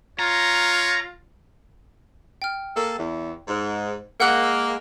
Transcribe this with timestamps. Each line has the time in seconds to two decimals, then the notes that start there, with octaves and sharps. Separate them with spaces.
0.19 F4 C#5 A#5
2.42 G5 F6
2.76 A#3 A4
2.97 E2
3.48 G#2
4.20 G#3 A#3 F#5 E6 F#6
4.44 E6